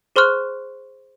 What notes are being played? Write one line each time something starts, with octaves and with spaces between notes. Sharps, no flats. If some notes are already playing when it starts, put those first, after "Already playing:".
G#4 C5 C6 C#6 F6 F#6